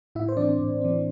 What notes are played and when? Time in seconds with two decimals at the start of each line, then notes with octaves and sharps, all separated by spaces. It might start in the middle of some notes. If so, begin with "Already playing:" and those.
0.15 A2 E4 E5
0.29 C5
0.37 E3 C4 D4 D5
0.60 A2
0.81 E3 C4